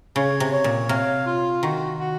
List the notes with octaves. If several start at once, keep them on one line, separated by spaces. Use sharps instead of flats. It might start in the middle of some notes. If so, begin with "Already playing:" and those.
C#3 C#5
C3
C#5
A#2
C3 F5
F4
D#3 F#4
F#4